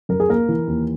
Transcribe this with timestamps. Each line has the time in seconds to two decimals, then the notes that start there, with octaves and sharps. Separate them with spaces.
0.09 F#2 A#4
0.20 G#4
0.29 A#3 A#4
0.48 E3
0.67 D#2